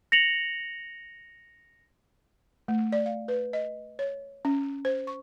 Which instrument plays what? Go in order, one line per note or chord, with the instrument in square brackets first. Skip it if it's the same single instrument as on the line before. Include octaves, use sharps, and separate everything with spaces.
[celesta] A#6 C#7 F7 F#7
[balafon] A3
D5
F5
B4
D#5
C#5
C#4
C5
C#6